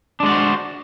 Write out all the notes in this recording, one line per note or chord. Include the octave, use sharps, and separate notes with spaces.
G#3 D4 F#4 C5 D5